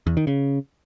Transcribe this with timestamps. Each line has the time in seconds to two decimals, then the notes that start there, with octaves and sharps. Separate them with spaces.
0.07 E2
0.17 D#3
0.27 C#3